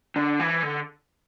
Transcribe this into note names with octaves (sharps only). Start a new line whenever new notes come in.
D3
E3
D3